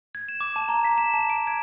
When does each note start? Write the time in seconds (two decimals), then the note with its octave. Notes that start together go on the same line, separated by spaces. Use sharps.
0.15 G#6
0.29 E7
0.41 D6
0.56 A5
0.69 A#5
0.84 B6
0.98 E7
1.14 A5
1.30 D7
1.47 G#6